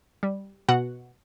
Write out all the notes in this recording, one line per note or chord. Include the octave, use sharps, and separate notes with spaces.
G3
B2 F#4 F#5